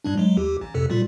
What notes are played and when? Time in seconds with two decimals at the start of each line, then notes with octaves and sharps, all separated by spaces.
0.04 G2 G3 D4
0.18 F#3 G#3
0.37 D#2 G4
0.61 A1
0.75 F2 C3 A4
0.90 A#2 G3 F4